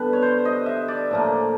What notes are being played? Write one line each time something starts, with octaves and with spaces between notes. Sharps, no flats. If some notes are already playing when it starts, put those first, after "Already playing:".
Already playing: D3 G3 B3 B4
C#5
C5
D#5
E5
D5
A2 F3 A#3